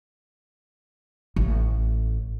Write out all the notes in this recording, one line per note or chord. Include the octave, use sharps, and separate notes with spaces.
A1